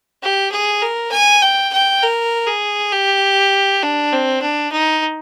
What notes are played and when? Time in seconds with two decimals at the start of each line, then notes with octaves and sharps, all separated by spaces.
0.22 G4
0.52 G#4
0.82 A#4
1.12 G#5
1.42 G5
1.73 G5
2.02 A#4
2.47 G#4
2.92 G4
3.83 D4
4.12 C4
4.42 D4
4.72 D#4